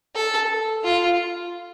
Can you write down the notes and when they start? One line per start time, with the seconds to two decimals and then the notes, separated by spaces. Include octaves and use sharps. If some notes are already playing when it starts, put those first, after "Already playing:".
0.16 A4
0.84 F4